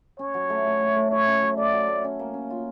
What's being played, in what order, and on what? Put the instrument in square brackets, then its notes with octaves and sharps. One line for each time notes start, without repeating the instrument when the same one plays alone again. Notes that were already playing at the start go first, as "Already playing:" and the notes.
[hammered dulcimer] C#4 [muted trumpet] C#5
[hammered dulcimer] F#3
A3
A3
A3
A3
[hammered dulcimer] E4 [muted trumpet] C#5
[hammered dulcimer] C#4
F#3
[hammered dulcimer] A3 [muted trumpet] D5
[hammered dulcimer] F#3
A3
C#4
A#3
C#4
F4